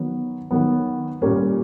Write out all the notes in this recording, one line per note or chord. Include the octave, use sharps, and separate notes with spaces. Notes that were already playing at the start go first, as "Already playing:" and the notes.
Already playing: D#3 F#3 B3
D#3 F#3 B3
A#2 G3 A#3 C#4